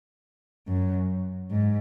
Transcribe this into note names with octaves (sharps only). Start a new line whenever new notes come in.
F#2
G#2